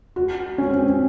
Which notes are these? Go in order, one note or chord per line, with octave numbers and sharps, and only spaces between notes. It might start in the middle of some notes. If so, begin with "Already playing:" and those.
F#4
C#4
C4
C#4